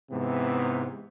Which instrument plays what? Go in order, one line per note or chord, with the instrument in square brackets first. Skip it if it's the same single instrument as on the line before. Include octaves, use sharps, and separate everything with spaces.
[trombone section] G#2 C3 E3 B3